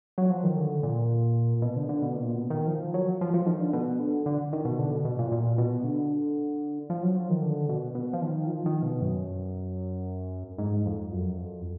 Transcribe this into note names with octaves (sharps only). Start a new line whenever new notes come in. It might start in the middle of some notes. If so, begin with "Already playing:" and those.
F#3
F3
D#3
D3
A#2
B2
D3
D3
B2
A#2
B2
D#3
F3
F#3
F3
F3
D#3
D3
B2
D3
D3
D#3
B2
D3
B2
B2
A#2
A#2
B2
D3
F3
F#3
F3
D#3
D3
B2
B2
F3
D#3
F3
D#3
B2
F#2
G#2
F2
F#2
F2